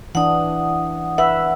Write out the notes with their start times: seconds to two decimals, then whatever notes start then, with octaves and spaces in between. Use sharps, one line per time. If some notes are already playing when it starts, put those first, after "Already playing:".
0.15 E3 D4 F#5 D#6
1.18 B4 E5 F#5